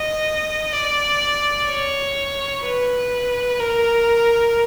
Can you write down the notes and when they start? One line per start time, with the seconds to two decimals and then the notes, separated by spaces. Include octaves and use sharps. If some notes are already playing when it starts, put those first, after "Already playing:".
Already playing: D#5
0.73 D5
1.68 C#5
2.63 B4
3.60 A#4